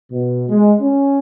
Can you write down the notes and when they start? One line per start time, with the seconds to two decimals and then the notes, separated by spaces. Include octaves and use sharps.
0.11 B2
0.49 G#3
0.80 C#4